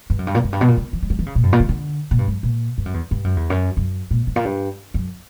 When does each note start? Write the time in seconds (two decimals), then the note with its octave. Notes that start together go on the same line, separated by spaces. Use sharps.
0.10 G2
0.19 F#2
0.27 G2
0.35 A#2
0.44 F#2
0.52 G2
0.61 B2
0.68 A#2
0.77 C#3
0.93 E3
1.03 G3
1.10 F#3
1.19 E3
1.26 C#3
1.35 A#2
1.43 F#2
1.53 A#2
1.60 C#3
1.69 D3
2.11 A#2
2.19 G2
2.28 F#2
2.43 A#2
2.78 G2
2.86 F#2
2.94 E2
3.11 G2
3.24 F#2
3.37 E2
3.50 F#2
3.77 F#2
4.11 A#2
4.27 G2
4.36 A#2
4.45 G2
4.94 F#2